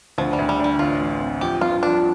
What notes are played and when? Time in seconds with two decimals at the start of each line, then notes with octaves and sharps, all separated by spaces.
0.18 D2 F3
0.33 G3
0.39 D2
0.49 G3
0.59 G3 D4
0.79 A1 F4
1.00 A1
1.21 C4
1.41 F3 G4
1.61 G2 F4
1.82 F3 D4